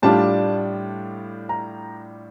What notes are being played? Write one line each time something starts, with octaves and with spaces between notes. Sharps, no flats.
A2 G3 D4 F4 A5
A#5